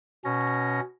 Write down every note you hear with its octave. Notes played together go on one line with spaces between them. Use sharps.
B2 C#4 A#6